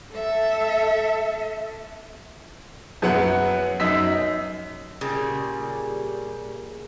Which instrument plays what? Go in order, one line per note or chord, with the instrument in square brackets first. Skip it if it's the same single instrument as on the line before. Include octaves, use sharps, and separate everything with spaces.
[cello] A4 E5
[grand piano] F#2 F#3 B3 F#5
F#2 D#4 E6 B6
[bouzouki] A#2 C#3 G3 G#4